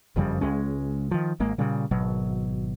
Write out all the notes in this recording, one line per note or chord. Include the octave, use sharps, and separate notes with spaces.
F#1 F2 C#3 G3
C#2 G#3 C#4
D#3 F3
G#1 G#3 A#3
A#2 C#3 G3
G#1 B2 F#3